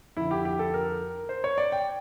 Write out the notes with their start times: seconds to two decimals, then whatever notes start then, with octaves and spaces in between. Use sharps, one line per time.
0.17 F2 D3 E4
0.31 G4
0.45 G4
0.59 A4
0.74 A#4
1.29 C5
1.44 C#5
1.58 D5
1.72 G5